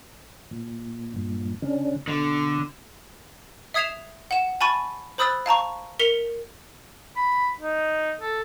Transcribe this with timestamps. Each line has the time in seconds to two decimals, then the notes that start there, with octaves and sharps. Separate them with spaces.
0.51 A#2
1.16 G2 A#2
1.62 C#3 C#4 D4
2.08 B2 D3
3.74 E5 D#6 G#6 C7 E7 F7
4.31 F#5 E7
4.61 G#5 A5 B5 C#6 A6 D#7
5.18 C5 B5 D#6 E6 F#6 A6
5.46 F5 A5 A#5 C#6
5.99 A#4 B6 C#7 F7 G7
7.16 B5
7.60 D#4
8.20 A4